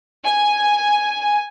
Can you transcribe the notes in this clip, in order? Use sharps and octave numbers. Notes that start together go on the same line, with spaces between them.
G#5